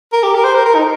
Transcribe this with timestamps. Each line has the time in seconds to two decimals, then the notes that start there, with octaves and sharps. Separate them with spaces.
0.13 A#4
0.23 G4
0.35 A#4
0.44 C5
0.55 A#4
0.66 A#4
0.75 D#4